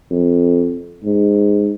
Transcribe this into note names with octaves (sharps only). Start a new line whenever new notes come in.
F2
G#2